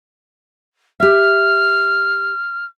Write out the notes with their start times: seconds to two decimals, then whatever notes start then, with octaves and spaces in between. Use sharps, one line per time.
1.00 G4 E5 F6